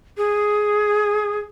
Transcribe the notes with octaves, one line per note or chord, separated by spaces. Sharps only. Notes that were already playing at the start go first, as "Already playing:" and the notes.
G#4